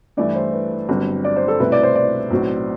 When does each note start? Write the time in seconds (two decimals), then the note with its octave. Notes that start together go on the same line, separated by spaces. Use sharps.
0.17 G2 E3 A3 E4 D5
0.35 C5
0.52 B4
0.89 G1 G2 D3 F#3 C4
1.24 D5
1.36 C5
1.48 A4
1.60 C2 B2 A3 C4 E4 B4
1.72 D5
1.83 C5
1.95 D5
2.31 B1 A2 F#3 C4 F#4